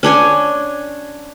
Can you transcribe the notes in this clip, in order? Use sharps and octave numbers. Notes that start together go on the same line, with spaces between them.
C#4 D4 C#5 G#5